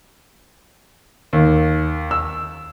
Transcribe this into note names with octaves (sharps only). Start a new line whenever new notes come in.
D#2
E6